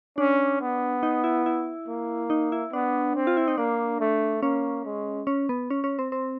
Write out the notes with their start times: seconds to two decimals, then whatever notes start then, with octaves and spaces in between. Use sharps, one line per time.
0.18 C#4 D4
0.61 B3
1.03 D#4
1.24 E4
1.46 E4
1.88 A#3
2.30 D#4
2.52 E4
2.73 B3 D4
3.15 C4
3.27 F4
3.37 E4
3.48 D#4
3.58 A#3 D4
4.00 A3
4.42 A#3 C#4
4.85 G#3
5.27 C#4
5.49 B3
5.70 C#4
5.84 C#4
5.99 C4
6.12 C4